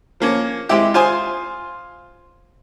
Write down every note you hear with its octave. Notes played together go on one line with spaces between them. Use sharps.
F3 A#3 C#4
G#3 C4 E4 G4
F4 C5 G#5 D#6